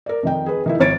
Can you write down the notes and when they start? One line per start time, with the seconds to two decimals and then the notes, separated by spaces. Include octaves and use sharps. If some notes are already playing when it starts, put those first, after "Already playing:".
0.06 A#4 D5
0.23 F2 D#3 G5
0.46 G#4 B4
0.66 D#3 D#4 E4
0.80 G#1 C#5 A6 D7